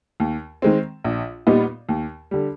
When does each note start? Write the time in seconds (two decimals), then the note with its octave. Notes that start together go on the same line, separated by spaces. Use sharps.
0.20 D#2
0.62 D#3 G#3 C4
1.04 A#1
1.47 A#2 G3 B3 D#4
1.89 D#2
2.31 D3 G3